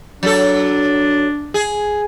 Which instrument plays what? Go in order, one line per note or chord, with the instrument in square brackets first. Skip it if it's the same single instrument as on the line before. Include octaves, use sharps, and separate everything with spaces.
[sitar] F#3 A4 [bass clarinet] D4
[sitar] G#4